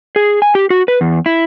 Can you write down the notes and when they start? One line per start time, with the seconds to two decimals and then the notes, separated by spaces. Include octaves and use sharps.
0.16 G#4
0.42 G#5
0.55 G4
0.70 F#4
0.88 B4
1.01 E2
1.26 E4